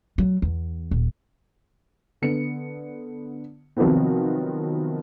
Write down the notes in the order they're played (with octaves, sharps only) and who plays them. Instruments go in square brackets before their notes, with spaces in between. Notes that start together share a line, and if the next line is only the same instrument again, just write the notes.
[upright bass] F#3
E2
D#1
[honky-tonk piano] D3 B3 C#7
C3 D#3 F3 F#3 B3 C4